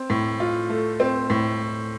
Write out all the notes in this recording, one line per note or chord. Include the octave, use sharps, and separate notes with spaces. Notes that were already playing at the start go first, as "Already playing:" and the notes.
Already playing: C4
A2
F4
A3
C4
A2